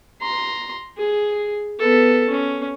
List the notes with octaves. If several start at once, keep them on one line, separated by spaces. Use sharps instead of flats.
A#5 C6
G#4
B3 A4
C#4